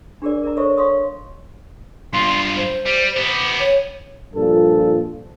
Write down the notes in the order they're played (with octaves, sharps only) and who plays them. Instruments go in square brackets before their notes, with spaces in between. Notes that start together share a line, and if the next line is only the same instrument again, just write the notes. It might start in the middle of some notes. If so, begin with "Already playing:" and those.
[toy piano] D4 G4 G#4 A#4 D5
A#4 D5 E5 A#5
A4 C5 C#5 D#5 E5 C#6
C#5 F5 C6 C#6 D#6
[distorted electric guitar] G2 F4 [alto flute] C6
[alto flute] C5
[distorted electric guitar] G3
B3 G4
[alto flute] C#5
[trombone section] G2 A#2 F3 A4